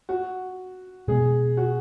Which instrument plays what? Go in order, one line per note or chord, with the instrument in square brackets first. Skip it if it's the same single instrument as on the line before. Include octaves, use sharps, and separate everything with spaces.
[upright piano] F#4
[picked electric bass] B2 G#3 B3 [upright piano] G#4
[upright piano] F#4